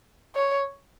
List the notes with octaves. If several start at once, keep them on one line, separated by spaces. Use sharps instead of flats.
C#5